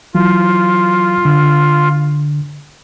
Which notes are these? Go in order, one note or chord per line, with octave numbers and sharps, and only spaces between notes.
E3 F#3 F4
D3